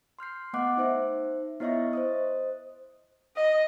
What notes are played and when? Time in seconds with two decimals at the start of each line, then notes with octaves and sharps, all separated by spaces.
0.19 C6 F6 G6 C7
0.53 A3 B3 D#5 F#5 D6 F#6
0.77 D#4 C5 E5
1.60 B3 E4 C#5 D#5 E5 C#6
1.93 C5 D#5 D#6
3.37 D#5